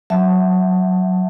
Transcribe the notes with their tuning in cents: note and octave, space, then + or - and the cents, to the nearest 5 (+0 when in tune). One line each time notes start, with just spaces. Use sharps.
F#3 +0 E5 +0 A5 +0